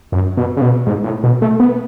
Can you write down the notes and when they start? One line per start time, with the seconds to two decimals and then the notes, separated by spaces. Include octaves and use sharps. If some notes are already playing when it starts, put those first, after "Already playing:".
0.12 F#2
0.37 B2
0.57 C#3
0.61 B2
0.87 G#2
1.04 A2
1.24 B2
1.42 A3
1.60 B3